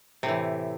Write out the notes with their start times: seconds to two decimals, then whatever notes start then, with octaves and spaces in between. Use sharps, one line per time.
0.23 C3
0.26 A2
0.28 E3